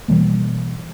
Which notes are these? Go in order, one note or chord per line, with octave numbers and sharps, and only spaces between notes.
B2 E3 G3 A#3